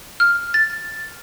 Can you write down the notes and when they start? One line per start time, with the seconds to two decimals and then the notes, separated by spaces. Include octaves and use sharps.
0.20 F6
0.54 A6